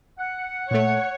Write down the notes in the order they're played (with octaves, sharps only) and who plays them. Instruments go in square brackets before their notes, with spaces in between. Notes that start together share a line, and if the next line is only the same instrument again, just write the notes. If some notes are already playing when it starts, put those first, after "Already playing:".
[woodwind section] F#5
[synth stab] A#2 A3 [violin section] C#5